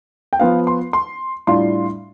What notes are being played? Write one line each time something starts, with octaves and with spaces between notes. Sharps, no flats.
G5
F3 B3 F4 F5
C6
C6
A2 G3 D4 F4 C6